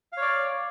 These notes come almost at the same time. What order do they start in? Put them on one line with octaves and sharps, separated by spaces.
F5 C#5 D5